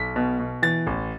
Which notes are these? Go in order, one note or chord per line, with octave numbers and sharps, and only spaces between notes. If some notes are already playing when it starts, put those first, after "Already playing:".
Already playing: B1 B6
B2
B2
E3 A6
A1